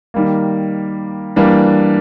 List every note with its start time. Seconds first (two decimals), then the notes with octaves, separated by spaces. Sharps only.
0.14 D#3 G3 A#3
1.36 E3 G3 A#3 D4